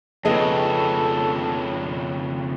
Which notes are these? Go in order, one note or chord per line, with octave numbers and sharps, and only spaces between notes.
F2 C#3 B3 G#4 A4 D#5